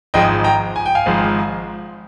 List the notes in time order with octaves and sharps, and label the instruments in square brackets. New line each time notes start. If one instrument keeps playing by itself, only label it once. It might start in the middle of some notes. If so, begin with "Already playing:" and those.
[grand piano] G#1 G#2 F3 D#5 G5
G5 A#5
G#5
G5
F5 G#5
G#1 G#2 F3